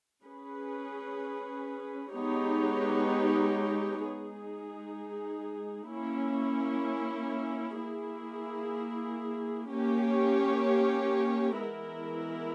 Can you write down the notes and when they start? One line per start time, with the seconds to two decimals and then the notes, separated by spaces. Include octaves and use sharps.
0.24 C#4 G#4 B4
2.14 G#3 B3 D#4 G4 C#5
4.03 G#3 D#4 G#4
5.91 A#3 C#4 E4
7.81 A#3 E4 G#4
9.69 A#3 C#4 G4 C#5
11.58 E3 G#3 B3 E4 A#4